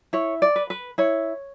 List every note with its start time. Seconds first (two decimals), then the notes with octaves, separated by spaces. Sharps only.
0.13 E4 C#5
0.42 D5
0.56 B4
0.70 B4
0.98 E4 C#5